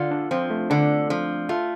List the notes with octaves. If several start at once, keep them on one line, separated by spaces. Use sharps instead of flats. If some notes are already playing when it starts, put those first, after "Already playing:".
Already playing: D3 F4
D4
F3 C4
A3
D3 D4
F3
A3 F4